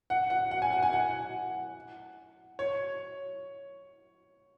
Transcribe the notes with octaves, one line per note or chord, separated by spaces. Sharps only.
F#5
F#5
F#5
G#5
F#5
G#5
F#5
C#5